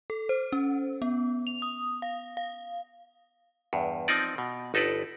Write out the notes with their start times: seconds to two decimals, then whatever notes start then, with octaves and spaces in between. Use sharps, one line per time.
0.10 A4
0.29 C5
0.52 C#4
1.02 B3
1.47 F7
1.62 D#6
2.02 F5
2.37 F5
3.73 E2 G2
4.08 F3 C4 D#4 D5
4.38 B2
4.74 G1 D#4 A4 B4 D5